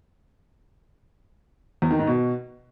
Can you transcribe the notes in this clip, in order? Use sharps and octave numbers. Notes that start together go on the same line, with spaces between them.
E2
D#3
G#2
B2